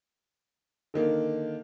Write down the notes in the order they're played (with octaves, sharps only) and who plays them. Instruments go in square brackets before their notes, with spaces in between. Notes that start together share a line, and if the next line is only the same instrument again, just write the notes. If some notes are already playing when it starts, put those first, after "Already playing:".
[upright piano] D3 D#3 A#3